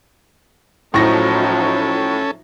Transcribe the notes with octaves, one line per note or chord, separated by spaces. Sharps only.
A2 F3 F#3 C#4 D#4 A4 C#6 A#6